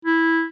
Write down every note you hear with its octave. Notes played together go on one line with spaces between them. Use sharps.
E4